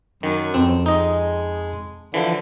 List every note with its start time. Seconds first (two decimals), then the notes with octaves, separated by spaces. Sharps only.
0.23 F#2 D#3
0.54 F2 C4
0.86 G#3 D#4 D#5
2.14 D3 E3 F3